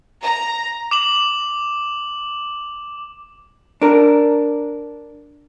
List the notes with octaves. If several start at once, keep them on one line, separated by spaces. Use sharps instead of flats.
A#5
D6 E7 F#7
D4 A#4